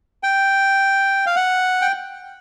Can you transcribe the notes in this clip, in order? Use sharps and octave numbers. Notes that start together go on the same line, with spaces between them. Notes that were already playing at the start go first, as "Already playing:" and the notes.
G5
F5
F#5
G5